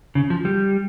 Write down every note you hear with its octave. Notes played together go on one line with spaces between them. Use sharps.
C#3
F3
G3